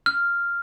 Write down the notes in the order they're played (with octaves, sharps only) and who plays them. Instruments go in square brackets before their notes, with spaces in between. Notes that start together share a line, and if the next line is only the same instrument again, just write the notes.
[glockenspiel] F6